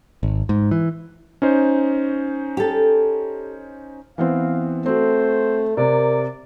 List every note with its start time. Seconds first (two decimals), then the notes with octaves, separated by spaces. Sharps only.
0.23 G#1
0.49 G#2
0.71 E3
1.42 C#4 D#4 C5
2.57 G4 A4
4.18 E3 B3 C4 F5
4.86 A3 C4 F#4 C5
5.77 C3 A#4 D5